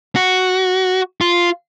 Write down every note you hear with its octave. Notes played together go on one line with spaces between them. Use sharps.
F#4
F4